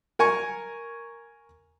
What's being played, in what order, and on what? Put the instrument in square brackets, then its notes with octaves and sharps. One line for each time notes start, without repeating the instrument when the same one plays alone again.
[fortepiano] A#4 G#5 C#6